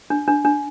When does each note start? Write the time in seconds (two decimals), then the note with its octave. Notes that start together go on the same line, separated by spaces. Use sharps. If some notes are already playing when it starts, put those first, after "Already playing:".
0.10 D4
0.28 D4
0.45 D4